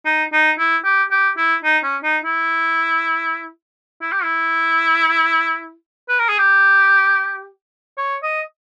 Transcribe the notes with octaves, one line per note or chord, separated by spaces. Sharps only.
D#4
D#4
E4
G4
G4
E4
D#4
C#4
D#4
E4
E4
G4
E4
B4
A#4
G#4
G4
C#5
D#5